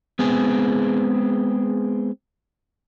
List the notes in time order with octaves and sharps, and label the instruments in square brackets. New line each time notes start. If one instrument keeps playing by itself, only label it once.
[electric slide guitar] G#3 B3 C4 G#4